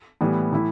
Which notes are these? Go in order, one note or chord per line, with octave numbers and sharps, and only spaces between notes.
A2 E3 G3 B3
A2 E3 A3 E4